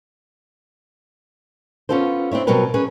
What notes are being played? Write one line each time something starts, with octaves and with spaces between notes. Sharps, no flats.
B3 C#4 F4 A4 A#4 C5
C4 D4 E4 C#5
B2 F#3 G3 C4 A#4 B4
C#4 G#4 B4